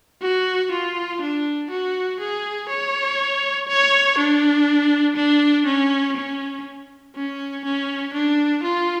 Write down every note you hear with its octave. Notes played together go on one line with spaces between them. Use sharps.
F#4
F4
D4
F#4
G#4
C#5
C#5
D4
D4
C#4
C#4
C#4
C#4
D4
F4